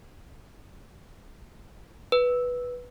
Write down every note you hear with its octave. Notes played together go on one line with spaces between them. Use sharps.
B4